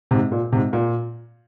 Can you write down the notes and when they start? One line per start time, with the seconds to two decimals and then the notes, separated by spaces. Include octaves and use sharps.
0.11 G#2 C3
0.32 A#2
0.52 G#2 C3
0.73 A#2